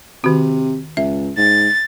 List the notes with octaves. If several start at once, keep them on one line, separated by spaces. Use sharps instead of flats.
C3 D#3 F#4
C#2 E5
G#2 A6